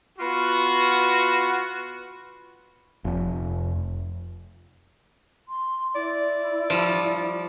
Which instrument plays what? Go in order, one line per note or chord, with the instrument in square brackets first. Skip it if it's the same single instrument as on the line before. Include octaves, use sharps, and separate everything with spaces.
[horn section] B3 F4 F#4
[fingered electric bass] F1
[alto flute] C6
[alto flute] E4 [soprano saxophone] D5
[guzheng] F3 G3